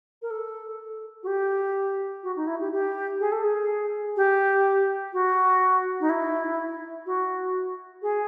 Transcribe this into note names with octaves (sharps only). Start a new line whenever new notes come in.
A#4
A4
F#4
G4
F#4
D#4
E4
G4
G4
G#4
A4
G#4
G4
F#4
D#4
E4
F#4
G#4